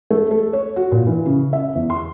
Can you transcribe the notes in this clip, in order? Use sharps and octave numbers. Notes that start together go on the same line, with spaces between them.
A3
A4
C#5
F#4
A#2
E3
C#3
E5
E2
C6